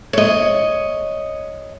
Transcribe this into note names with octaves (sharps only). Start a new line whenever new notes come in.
C#5 D#5